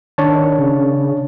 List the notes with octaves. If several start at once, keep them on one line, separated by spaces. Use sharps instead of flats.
D#3 D4 C#5 A5
C#3